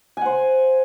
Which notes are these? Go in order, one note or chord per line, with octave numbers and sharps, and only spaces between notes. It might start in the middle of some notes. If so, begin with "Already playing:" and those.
C5 F#5 G#5